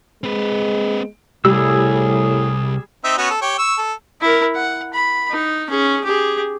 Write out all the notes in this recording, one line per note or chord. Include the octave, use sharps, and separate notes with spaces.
G#3 C4 B4
C2 A2 G3 G#4 E6
C4 D#4 E5
B3 C#4 F#4
A4
G4 C#5 G5
C#6 E6
A4
E4 A#4
F#5
B5
D#4
C#4 G#4
G4 G#4